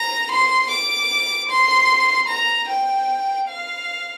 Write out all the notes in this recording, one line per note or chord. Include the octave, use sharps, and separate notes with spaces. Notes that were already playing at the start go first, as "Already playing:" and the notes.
Already playing: A#5
C6
D6
C6
A#5
G5
F5